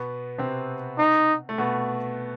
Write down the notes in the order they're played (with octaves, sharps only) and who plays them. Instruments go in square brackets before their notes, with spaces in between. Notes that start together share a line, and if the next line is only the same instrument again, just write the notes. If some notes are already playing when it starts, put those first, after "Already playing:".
Already playing: [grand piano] B2 B3
C3 C4
[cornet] D#4
[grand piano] A3
B2 B3